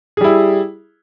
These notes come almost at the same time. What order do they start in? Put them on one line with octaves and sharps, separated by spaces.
G#4 G3 E4